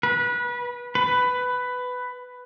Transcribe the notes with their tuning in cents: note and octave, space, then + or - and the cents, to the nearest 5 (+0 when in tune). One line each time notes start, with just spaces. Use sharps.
B4 -25
B4 +10